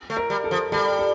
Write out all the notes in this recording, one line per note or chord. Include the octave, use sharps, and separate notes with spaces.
A3
A#4
G3
A4
F3
G3 A4
A4